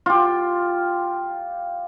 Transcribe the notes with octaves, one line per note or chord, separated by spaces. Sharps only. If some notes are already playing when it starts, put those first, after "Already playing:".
F4 G4